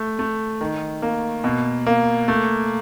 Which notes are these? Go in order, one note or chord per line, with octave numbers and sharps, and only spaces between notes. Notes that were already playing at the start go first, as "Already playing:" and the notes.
Already playing: A3
A3
D#3
A#3
B2
A#3
A3